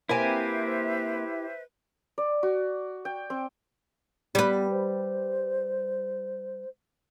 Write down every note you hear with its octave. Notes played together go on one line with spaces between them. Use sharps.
A#3 C4 E4 G4 B4 C5 E5 G#5
D5
F#4
G5
C4
G3 B3 B4
C5